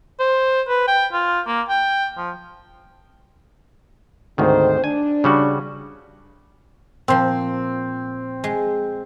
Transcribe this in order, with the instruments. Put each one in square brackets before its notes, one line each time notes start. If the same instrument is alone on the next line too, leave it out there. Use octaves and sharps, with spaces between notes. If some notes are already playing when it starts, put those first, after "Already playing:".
[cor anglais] C5
B4
G5
F4
A#3
G5
F3
[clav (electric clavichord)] D2 G#2 D#3 [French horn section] C4 C5
[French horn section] D4 [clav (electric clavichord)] G#5
[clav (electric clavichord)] C#3 G3 F#4
[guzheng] A#2 F3 [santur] C4
[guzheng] G#3